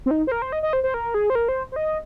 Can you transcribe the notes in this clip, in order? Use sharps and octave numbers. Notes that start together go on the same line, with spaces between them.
C4
D#4
C5
A#4
C5
D#5
D#5
C5
C5
A#4
G#4
C5
A#4
C5
C5
D#5